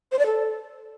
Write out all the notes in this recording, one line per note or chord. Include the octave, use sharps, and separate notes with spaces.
C5
D5
A4